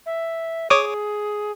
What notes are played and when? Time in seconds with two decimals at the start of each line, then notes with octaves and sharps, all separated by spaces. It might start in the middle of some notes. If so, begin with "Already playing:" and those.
0.06 E5
0.70 G#4 C#5 D6 D#6